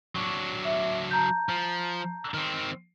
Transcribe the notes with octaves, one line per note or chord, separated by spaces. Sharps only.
F#3 D4 C#6
E5
A5 A#5 G6
F3
D#3 C4